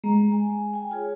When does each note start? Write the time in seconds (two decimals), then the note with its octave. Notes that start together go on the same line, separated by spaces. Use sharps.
0.04 G#3 A#5
0.32 G#5
0.74 G5 G#5
0.91 F4 G#4 C#5